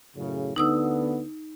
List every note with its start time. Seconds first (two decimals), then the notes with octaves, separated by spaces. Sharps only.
0.16 F#2 A2 C#3
0.56 D2 D3 B3 D#4 D#6 E6